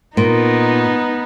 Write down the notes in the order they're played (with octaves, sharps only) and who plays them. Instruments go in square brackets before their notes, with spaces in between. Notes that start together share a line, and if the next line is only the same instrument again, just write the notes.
[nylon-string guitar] A#2 [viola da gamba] B3 D#4